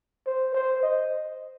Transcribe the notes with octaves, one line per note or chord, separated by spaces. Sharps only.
C5
C5
D#5